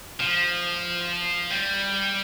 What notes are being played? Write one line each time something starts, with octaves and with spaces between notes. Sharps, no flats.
F3
G3